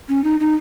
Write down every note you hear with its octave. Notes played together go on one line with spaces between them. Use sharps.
C#4
D#4
D#4